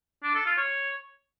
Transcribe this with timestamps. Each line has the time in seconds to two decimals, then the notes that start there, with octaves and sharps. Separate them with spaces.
0.23 D4
0.34 A4
0.46 F4
0.57 C#5